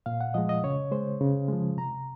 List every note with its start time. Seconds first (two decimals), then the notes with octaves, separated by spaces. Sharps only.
0.06 A#2 F5
0.21 F#5
0.34 F3 G#3 D#5
0.49 D#5
0.64 C#3 C#5
0.91 G#3 C5
1.21 C#3
1.48 F3 G#3
1.77 C3 A#5